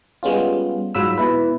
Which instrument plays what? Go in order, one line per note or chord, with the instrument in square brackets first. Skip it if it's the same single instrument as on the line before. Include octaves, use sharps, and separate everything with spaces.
[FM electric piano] G3 G#3 B3 C#4 F4
G#2 F#3 F4 B5 E6
B2 E4 B4